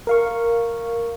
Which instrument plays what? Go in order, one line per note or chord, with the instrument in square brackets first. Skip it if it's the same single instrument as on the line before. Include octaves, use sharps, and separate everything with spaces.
[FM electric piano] A#4 F5 C#6